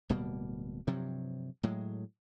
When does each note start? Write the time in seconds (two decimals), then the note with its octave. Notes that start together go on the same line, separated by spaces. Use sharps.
0.09 D1 B2 G3 A#3
0.87 G2 C3 F3 F#3
1.63 A2 F#3 G#3